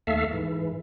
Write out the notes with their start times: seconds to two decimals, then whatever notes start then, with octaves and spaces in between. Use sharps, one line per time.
0.07 D#2 A3 A4 E5 F5
0.33 G#2 E3